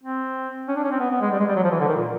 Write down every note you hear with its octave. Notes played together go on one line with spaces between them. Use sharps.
C4
C#4
D4
C#4
C4
B3
B3
G#3
G3
G#3
G3
F#3
F3
E3
D3
D#3
A#2